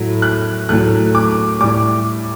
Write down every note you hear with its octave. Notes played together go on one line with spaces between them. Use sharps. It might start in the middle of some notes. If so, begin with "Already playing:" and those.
Already playing: A2 F#3 A3
F#6
A2 F#3 A3 F#6
D6
A2 G3 D6